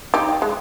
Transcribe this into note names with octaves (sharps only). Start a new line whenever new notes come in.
D#4 G4
G#3